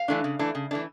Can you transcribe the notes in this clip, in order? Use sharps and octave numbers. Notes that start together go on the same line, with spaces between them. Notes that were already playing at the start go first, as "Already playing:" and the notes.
Already playing: F5
E3 A3 D4
C#3
E3 A3 D4
C#3
E3 A3 D4